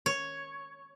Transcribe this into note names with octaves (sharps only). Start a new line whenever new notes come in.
C#5